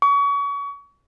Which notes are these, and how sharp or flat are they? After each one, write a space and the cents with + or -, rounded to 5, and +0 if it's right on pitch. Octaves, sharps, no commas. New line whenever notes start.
C#6 +30